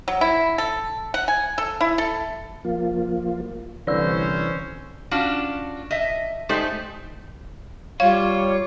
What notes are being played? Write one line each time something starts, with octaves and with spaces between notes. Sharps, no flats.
F#3
E4
A4
F#5
G#5
A4
E4
A4
F3 A#3 F4
C2 D3 E3 C#4 B4 C5 D5 E6
C#4 D4 F4 F#4
D#5 E5
G#3 A3 D#4 G4 C5 D5
G3 F4 C#5 F5